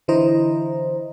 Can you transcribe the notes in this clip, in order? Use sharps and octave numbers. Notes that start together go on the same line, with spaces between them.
D3 E3 E4 C5 D#5 A#5